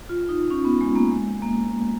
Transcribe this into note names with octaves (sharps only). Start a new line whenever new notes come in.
F4
D#4
C#4
B3
G#3
A#3
G#3
A#3